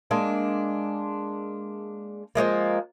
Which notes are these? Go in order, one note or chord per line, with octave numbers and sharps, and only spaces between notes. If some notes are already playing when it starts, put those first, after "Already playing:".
G#3 A#3 D4
F3 G3 G#3 A#3